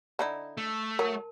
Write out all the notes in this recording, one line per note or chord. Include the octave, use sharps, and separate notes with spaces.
D3 D#4 E4
A3
F#3 A#4 A5